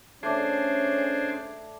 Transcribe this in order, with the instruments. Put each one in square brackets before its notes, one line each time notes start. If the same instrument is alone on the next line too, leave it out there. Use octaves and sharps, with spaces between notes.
[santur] A3 D5 [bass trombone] C#4 [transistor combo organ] D4 G#4 C5